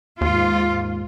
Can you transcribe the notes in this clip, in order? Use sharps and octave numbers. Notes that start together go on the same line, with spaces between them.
D#2 G#2 F4